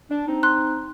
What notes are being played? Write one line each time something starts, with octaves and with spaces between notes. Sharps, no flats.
D4
C4 D#4
C6 F#6